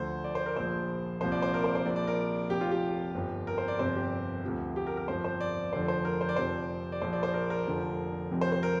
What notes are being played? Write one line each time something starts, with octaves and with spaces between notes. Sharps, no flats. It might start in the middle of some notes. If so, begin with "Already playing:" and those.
Already playing: D2 D3 F3 C5
D5
C5
A#4
A#1 A#2 F3 C5
C2 A#2 F3 C5
D5
C5
A#4
C5
C5
A#1 A#2 F3 D5
D5
A#4
F1 F2 F3 G4
F4
G4
G1 F2 F3
A#4
C5
D5
G1 F2 C3 F3 C5
G4
D2 C3 F3
G4
A#4
A#4
G1 F2 F3 C5
C5
D5
F1 F2 D3 F3 C5
C5
A#4
C5
D5
F1 F2 C3 F3 C5
D5
A#1 A#2 F3 C5
D5
C5
A#4
A#4
F1 F2 D3 F3
F1 F2 C3 F3
C5
C5
A#4